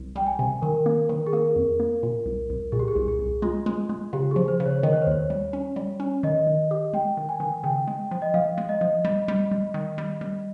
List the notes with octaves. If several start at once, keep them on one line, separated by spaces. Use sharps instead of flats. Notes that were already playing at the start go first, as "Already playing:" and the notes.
Already playing: C2
G3 G5
G#5
C3
D#3 A#4
A#3
D#3
G#4
A#3 A#4
F2
A#3
A#2
C2
C2
A#2 G#4
G4
G#4
C2
G#4
C2
G#3 F4
G#3
G#3
C#3 G4
F3 G#4
C5
C#3
C#5
D#3 D#5
C#5
C5
D#2 C#5
G3
C#4
G3
C#4
D#3 D#5
D#3
G4
G#3 G5
D#3
G#5
D#3
C#3 G5
G#3
F3
D#5
F3 F5
G#3
D#5
F3
G3
G3
G3
D#3
G3
G3